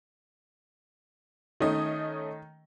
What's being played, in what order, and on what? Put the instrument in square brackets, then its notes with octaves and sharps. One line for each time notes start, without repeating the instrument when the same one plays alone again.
[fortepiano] D#3 [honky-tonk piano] A3 C#4 D#5